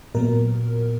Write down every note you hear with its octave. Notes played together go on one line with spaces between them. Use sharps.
A#2 F#3 B3 A#4